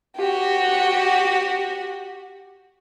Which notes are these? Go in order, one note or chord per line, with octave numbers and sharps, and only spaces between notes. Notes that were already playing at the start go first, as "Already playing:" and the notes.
F#4 G4